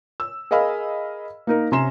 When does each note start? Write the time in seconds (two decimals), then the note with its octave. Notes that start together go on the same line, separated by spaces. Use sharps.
0.20 E6
0.51 G#4 A#4 D#5 F5 B5 E6
1.47 A#3 D#4 A#4
1.72 C3 C#4 A#5 C6 E7